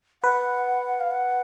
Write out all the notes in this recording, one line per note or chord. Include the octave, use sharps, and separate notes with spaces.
B4 F#5
F5
F#5